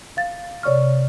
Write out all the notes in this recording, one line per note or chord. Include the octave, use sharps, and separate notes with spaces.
F5 A6
C3 C#5 D5 C#6 F6